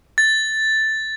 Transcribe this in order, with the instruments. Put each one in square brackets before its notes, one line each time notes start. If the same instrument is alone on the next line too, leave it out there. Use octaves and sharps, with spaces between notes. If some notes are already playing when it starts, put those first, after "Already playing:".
[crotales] A6